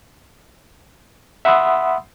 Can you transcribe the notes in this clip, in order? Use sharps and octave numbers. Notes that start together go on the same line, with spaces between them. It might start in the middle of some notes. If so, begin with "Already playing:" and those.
E5 F#5 B5 C6 D#6 E6